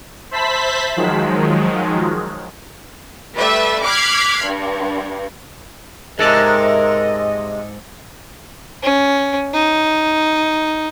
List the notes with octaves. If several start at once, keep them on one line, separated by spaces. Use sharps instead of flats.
C5 E5 A5 B5 B6
D#3 F3 F#3 G#3
G3 A3 B4 D5 E5
D6 F6 F#6 G#6 B6 C7
G2
G#2 C3 G#3 A4 A#4 D5 D#5
C#4
D#4